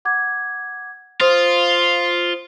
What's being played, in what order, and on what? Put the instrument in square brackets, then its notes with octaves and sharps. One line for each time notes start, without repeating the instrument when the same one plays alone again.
[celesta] F#5 D6 G#6
[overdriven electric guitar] F4 [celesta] C5 D#6